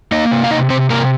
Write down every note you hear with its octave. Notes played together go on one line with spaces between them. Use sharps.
A#3 D#4 D#5
C3
F5
C3 D#4 D#5
C3 C4 C5
C3 A#3 A#4